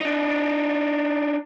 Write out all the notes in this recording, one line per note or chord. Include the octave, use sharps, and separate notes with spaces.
D4 D#4